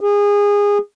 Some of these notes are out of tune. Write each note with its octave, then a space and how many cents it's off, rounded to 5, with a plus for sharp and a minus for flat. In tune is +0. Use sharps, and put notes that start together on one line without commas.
G#4 -25